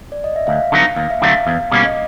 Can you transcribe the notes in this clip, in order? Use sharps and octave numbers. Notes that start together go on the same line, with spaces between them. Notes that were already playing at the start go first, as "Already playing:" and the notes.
D5
D#5
E5
D2 F5
D3 F#3 B3 D#4
D#2 F5
E5
D3 F#3 A3 C4 F5
E2
B2 G3 A#3 C#4
D#5